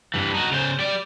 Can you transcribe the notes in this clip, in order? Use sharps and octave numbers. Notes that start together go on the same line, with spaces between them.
G2 E3
D#4 F#4
C#3 C5
G3 D5